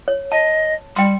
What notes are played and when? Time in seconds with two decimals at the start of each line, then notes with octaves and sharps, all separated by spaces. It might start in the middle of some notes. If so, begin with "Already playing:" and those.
0.08 C#5
0.32 D#5 A5
0.96 G3 G5 C6